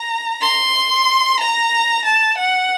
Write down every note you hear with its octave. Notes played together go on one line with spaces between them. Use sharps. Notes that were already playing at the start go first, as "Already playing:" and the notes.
Already playing: A#5
C6
A#5
A5
F#5